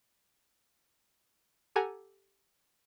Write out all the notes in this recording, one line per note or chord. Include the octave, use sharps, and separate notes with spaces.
G4 A4 F#5 G#5 A#5